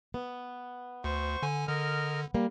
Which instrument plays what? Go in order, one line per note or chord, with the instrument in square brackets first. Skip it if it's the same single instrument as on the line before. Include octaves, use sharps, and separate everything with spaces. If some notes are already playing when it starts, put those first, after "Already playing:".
[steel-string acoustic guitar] B3
[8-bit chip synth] D2 [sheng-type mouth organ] C5 C#6
[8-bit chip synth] D3 G#5
[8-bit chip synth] D3 [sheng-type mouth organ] A#4 D#5 F6
[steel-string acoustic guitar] G3 A#3